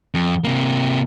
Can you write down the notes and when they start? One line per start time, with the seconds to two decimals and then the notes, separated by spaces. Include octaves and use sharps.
0.14 F2
0.44 C3 A#3